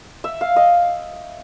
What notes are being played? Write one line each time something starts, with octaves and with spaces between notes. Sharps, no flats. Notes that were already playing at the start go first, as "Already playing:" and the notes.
E5
F5
D#5